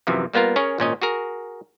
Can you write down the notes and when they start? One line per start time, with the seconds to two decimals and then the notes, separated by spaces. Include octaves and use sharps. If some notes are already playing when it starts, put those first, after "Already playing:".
0.07 F#2 C3 E3 F3
0.33 G3 A#3 B3 F4 A#4
0.56 C#4 G#4 A#4 C#5
0.78 G#1 A#2 C#4 D#5
1.02 F#4 G#4 A#4